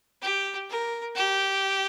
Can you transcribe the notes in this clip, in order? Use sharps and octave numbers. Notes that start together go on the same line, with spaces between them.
G4
A#4
G4